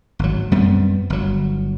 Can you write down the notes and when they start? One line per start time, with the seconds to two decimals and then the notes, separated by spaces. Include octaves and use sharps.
0.19 G#1 F#3
0.51 F#2 G3 B3 C4
1.10 G1 F#3